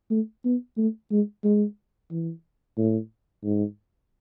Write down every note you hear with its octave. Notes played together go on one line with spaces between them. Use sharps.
A3
B3
A3
G#3
G#3
E3
A2
G#2